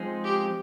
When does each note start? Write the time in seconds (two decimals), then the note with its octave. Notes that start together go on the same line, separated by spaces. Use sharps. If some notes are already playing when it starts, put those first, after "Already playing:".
Already playing: F3 G#3 C4 D#4 G#4
0.24 G4